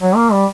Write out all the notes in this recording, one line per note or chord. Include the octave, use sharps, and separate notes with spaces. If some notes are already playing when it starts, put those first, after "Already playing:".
F#3
A#3
G3